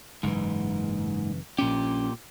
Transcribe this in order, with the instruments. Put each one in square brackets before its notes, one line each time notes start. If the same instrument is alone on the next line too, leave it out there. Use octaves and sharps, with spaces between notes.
[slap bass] F#1 E3 [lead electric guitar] G#2
[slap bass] A#1 C#4 [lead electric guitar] A#2 G4